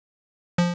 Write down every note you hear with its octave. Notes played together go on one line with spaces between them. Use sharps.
F3